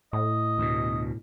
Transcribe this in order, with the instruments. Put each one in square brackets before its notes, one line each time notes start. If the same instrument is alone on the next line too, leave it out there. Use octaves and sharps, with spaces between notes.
[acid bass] A2 [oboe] D#5
[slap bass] D2 B2